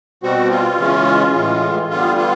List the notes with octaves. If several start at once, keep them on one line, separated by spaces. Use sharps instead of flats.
B2 G3 C4 F#4
F4
C#3 E3 G#3 C#4
A2 E3 G#3
D3 G3 B3 F4
F4